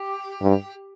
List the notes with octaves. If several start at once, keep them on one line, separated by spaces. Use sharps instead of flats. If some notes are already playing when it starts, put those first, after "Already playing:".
Already playing: G4
G2